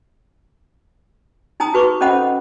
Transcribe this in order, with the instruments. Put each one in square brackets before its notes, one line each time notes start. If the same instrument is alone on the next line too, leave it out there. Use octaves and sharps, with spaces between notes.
[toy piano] D#4 G#5 A#5 D#6
F#4 B4 C#6 D6
C#4 A4 C5 D#5 F#5 B5